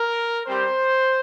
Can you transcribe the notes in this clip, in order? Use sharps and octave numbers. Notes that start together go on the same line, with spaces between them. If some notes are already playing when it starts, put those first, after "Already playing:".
Already playing: A#4
G3 C4 G4 C5